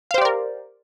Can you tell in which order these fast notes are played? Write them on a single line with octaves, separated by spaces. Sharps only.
F5 C5 G4 D5 A#4